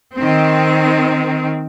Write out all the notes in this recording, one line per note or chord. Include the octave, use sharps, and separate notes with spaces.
D#3 C4